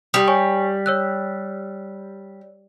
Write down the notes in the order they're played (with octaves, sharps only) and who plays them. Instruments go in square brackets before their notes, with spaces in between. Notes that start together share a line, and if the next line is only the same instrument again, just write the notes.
[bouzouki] G3 [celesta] G4 D#6
[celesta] C#5 G#5 C#6
C#5 E6 F#6